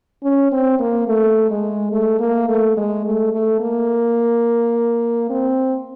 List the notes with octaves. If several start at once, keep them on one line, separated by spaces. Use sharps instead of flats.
C#4
C4
A#3
A3
G#3
A3
A#3
A3
G#3
A3
A3
A#3
C4